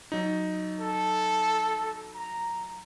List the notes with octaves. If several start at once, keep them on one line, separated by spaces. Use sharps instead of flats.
F#3 D#4
A4
A#5